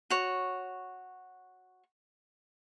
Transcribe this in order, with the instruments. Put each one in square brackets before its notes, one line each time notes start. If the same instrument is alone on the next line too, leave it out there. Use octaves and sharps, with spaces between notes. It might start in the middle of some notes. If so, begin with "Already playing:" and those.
[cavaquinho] F#4 C#5